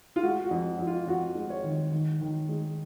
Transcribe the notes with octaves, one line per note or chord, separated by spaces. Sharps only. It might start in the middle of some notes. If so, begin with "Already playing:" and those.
F4
G#3 F#4
F#4
F2
F2
F4
F2 F#4
G#3
C#5
D#3
D#3
D#3
G#3